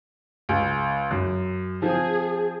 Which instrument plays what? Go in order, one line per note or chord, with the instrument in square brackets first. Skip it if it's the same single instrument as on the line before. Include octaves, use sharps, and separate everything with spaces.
[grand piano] C#2
F#2
[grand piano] F3 C4 [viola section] G#4